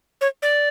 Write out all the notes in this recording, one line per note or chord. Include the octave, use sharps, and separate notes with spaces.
C#5
D5